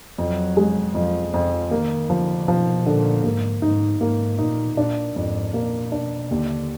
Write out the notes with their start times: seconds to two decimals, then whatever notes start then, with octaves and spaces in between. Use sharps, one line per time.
0.18 F2 F#3
0.57 G#3
0.94 F2 F3
1.33 F2 F3
1.71 D#3 A#3
2.10 D3 F3
2.48 B2 F3
2.86 A#2 D3
3.24 G#2 A#3
3.62 G#2 D#4
4.00 G#2 A#3
4.39 A#2 D#4
4.77 A#2 D4
5.15 F2 G#2
5.54 A#2 A#3
5.92 B2 D4
6.30 D#2 D3